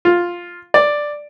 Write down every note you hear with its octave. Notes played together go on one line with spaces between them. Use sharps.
F4
D5